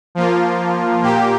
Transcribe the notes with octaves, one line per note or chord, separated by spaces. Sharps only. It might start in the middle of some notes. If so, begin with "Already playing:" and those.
F3 A#3 F4
A#2 A#3 G4